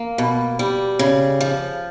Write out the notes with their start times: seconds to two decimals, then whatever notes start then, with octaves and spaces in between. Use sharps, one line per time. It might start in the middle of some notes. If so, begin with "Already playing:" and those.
Already playing: A#3
0.18 B2
0.59 G3
0.99 C#3
1.41 F3